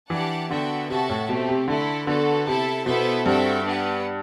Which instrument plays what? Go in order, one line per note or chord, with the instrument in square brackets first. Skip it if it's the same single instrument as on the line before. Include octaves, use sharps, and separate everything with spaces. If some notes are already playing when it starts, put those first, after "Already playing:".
[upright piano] E3 [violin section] D4 G4 D5 F#5 A5
[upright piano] D3 [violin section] B3 F#4 A4 E5 G5
[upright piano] C3 [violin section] F#4 A4 E5 A5
[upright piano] A2
[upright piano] B2 [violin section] A3 C4 G4
[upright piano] C3
[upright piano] D3 [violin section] A3 E4 A4
[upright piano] D3 [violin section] B3 F#4 A4
[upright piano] C3 [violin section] E4 A4 E5 A5
[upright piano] B2 [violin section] B3 E4 A4 C5 E5
[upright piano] G2 [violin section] C4 F#4 A4 E5 G5
[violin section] B3 D4 G4 B4 F#5